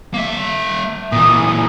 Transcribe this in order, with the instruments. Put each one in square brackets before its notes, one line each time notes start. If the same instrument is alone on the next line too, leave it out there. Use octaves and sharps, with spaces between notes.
[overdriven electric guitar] A#3 E5
[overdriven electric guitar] A#2 E3 [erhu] D#6